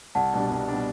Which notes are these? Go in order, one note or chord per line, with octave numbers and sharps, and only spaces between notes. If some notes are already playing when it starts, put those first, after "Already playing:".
C2 F#5 A5
B2 G3 D4
C2
B2 G3 D4